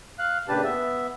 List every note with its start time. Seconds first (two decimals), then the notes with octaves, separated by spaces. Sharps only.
0.19 F5 F#6
0.49 A#2 C#3 D4 G4 B4 A5
0.64 B3 E5